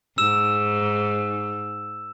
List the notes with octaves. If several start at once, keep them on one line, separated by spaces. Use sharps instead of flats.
G#2 E6 E7